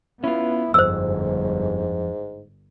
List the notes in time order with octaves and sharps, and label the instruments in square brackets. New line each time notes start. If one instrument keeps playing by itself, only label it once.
[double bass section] B3 [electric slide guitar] C#4 F4 [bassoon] E4
[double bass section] G1 [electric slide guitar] F2 [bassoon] G#2 [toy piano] C5 E6